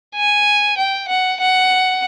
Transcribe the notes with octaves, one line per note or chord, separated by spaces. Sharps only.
G#5
G5
F#5
F#5